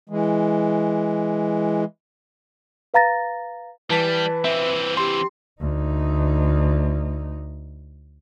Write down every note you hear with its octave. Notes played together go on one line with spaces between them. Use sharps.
E3 G#3
B4 F5 A#5 A6 A#6
E3 G3 B4 A5 B6
E3 C4 E5
G4 C6
D2 D#4